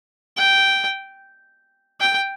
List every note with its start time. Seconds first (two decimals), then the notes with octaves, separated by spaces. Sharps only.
0.36 G5
2.00 G5